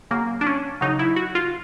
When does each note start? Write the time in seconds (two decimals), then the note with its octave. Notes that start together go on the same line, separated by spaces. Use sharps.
0.11 C#3 F#3 A#3
0.41 D4
0.47 C#4
0.81 C#3 F#3 D#4
0.99 E4
1.16 F#4
1.35 F4